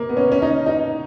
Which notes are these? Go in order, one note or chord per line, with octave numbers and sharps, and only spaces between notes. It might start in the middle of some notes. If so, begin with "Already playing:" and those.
Already playing: A#3
B3
C#4
C#4
D#4
D#4